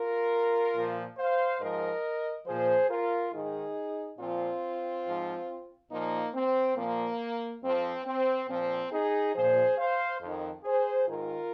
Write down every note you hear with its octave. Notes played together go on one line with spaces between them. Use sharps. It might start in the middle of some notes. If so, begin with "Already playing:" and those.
Already playing: F4 A#4
A#2 F3
C5 F5
G#2 F3 A#4 D#5
A#2 F3 G#4 C5
F4 A#4
G#2 D#3 D#4 G#4
A#2 F3 C4 F4
G#2 F3
A#2 F3 A#3 D#4
C4
A#2 F3 A#3
F2 F3 C4
C4
A#2 F3 C4
D#4 G#4
A#2 F3 G#4 C5
C5 F5
F2 D#3
G#4 C5
G#2 D#3 F4 A#4